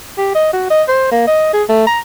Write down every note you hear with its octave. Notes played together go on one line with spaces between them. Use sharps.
G4
D#5
F#4
D#5
C5
A#3
D#5
G#4
A3
A#5